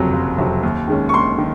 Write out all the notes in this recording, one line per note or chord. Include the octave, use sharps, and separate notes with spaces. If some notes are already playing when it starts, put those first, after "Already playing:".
Already playing: F#1 F2 C3 F#3
F#1
F2 C3 F#3
D#2
D#3 G#3 C#4
C#6
D#2 C6
D#3